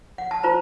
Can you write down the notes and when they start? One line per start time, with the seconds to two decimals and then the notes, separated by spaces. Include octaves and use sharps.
0.18 F#5
0.31 A5
0.43 F4 C5 A#5